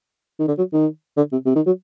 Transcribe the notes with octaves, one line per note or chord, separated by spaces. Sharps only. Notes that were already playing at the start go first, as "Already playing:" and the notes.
D#3
D3
F#3
D#3
D3
C3
C3
D#3
F#3